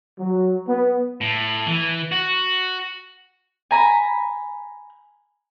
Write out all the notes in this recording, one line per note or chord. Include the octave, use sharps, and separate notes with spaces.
F#3
B3
A2
E3
F#4
G#5 A#5 B5